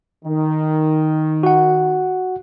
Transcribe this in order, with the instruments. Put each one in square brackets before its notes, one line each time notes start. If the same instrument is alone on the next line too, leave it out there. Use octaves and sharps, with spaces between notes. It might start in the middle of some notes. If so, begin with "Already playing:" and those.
[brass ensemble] D#3
[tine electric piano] F#4 F#5